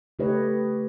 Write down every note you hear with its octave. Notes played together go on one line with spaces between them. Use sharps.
C#3 A3 G4 B4 C#5 D#5